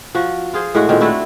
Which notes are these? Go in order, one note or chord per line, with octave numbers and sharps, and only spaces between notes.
F3 F#4
F4 G#4 C5
A2 G#3 F#4
A#2 D#3 G#3 C4
A3 D4 E4 F#4